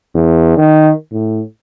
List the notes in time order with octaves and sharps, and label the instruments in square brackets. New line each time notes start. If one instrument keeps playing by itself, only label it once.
[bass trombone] E2
D#3
A2